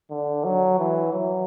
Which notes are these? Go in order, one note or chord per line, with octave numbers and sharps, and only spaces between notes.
D3
F#3
E3
F#3